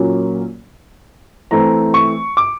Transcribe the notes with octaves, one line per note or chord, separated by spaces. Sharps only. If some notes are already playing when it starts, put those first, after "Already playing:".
Already playing: A#2 F#3 A#3 C#4
E3 A3 C4 A#5
C#6
D6